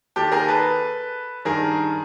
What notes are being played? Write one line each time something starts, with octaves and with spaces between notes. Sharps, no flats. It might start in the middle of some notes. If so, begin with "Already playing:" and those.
D#2 D#3 G4 A4
G#4 A#4
A4 B4
G2 D#3 G#4 A#4